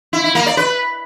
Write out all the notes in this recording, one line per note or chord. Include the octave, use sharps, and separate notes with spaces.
E4
E4
A#3
D5
B4